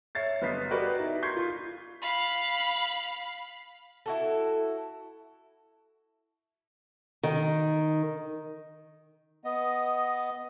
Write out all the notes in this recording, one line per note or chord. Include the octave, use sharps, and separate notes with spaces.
C#5 E5 A6 C7
G1 B3 D#5 B6 C7
F#4 G4 A#4 B4 D5 D#5
D#4 E4
C6 C#6 G6 G#6 B6 C7
F4
F5 B5
E4 F#4 A4
D#3
B3 D#5